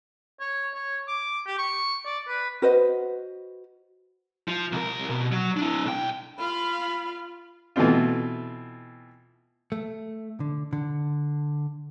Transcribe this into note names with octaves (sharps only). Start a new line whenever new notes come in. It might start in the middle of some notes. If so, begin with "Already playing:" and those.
C#5
C#5
D6
G4
C#6
D5
B4
F#4 B4 C5 D#5
F3
C2 A#4
B2
F#3
D4 E4
B1 G5
F4 F5 B5
B2 E3 A3 C4 F4
A3
D3
D3